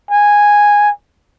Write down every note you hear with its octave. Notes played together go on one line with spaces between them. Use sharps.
G#5